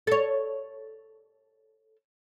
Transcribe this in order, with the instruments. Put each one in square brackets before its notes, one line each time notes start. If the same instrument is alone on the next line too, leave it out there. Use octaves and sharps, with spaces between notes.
[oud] A4 C#5